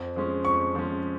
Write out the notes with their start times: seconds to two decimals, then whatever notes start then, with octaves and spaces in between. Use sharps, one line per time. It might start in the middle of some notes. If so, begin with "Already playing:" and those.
Already playing: F2
0.16 F3 G#3 C#4
0.45 F2 C#6
0.75 F3 G#3 C#4